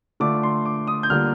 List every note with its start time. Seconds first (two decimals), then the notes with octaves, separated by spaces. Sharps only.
0.20 D3 A3 D4 F4 D6
0.43 C6
0.65 D6
0.87 D#6
1.03 G6
1.10 D3 G3 A#3 D4 F4 F6